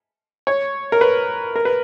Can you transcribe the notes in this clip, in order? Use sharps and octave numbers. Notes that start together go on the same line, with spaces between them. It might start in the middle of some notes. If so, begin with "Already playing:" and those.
C#5
A#4
B4
A#4
B4